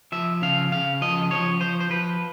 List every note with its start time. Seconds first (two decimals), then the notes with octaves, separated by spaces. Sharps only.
0.12 F3 E5
0.42 C#3 F5
0.72 C#3 F5
1.01 F3 D#5
1.31 F3 C#5
1.61 F3 C5
1.80 C5
1.90 F3 B4